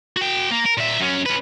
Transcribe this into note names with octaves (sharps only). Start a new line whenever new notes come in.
F#4 G5
A#3
A#4
A#2 E5
F#2 C#4
C#4 B4